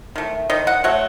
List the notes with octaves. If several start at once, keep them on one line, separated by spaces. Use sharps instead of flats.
D#3 A3
D#3 D#5
F#5
F#3 A3 F#5